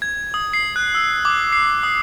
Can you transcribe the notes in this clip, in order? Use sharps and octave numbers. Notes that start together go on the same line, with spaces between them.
G#6
D#6
C7
F#6
E6
D6
C7
D#6